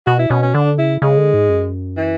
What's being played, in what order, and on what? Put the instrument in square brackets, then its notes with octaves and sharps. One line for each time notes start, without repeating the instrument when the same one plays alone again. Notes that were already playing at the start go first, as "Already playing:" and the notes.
[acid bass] B2 [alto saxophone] F#4
[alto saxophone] E4
[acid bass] B2 [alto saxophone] C#4
[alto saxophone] C#4
[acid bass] D3 [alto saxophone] D4
[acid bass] C#3 [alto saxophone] E4
[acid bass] C#3 [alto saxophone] G#3
[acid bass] D3
G#2
F#2
[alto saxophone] E3